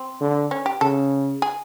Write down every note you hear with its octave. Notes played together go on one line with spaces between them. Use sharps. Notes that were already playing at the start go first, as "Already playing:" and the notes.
Already playing: C4
D3
C#4
G4
C#3 A4
G#4